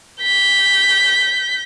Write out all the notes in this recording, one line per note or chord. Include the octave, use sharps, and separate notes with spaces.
G6 B6